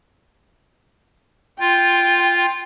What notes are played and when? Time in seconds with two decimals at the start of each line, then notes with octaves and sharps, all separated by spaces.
1.60 F4 G5